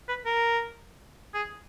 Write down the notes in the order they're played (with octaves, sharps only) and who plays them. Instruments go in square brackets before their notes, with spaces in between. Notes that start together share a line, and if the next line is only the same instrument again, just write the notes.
[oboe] B4
A#4
G#4